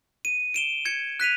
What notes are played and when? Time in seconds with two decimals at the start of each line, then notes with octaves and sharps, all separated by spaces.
0.25 D#7
0.54 D7 E7 G7
0.85 G#6 C#7
1.20 F#6 B6 D#7 F7